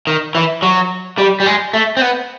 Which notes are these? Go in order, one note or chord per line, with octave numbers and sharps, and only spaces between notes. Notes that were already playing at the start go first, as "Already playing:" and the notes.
D#3
E3
F#3
G3
G3
G#3
A3
C4
B3